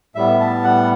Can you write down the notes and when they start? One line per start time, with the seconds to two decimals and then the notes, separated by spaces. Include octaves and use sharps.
0.15 A2 G3 B3 E5
0.40 A5
0.64 F#5